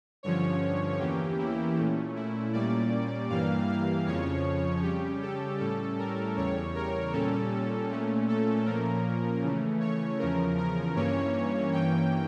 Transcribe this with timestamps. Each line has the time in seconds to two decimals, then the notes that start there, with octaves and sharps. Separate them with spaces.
0.23 G2 D3 F3 C#4 C#5
1.00 E2 E3 A#3 C#4 G4
1.38 E4
1.77 A#2 A3 C#4
2.16 E4
2.53 A#2 G3 A#3 C#4 D5
3.29 G2 E3 G3 A#3 F5
3.68 F5
4.07 F2 C#3 F3 C#4 C#5
4.83 C#3 G3 C#4 G4
5.22 A4
5.59 A2 G3 C#4 A4
5.99 A#4
6.37 E2 C#3 G3 C#5
6.75 A#4
7.13 A#2 G3 C#4 A4
7.90 A#2 A3 C#4
8.28 A4
8.65 A#2 F3 A#3 C#4 A#4
9.43 C#3 E3 A3 C#4
9.80 C#5
10.19 E2 C#3 F3 C#4 A#4
10.58 A#4
10.96 G2 E3 A#3 C#4 C#5
11.73 G2 E3 A#3 C#4 G5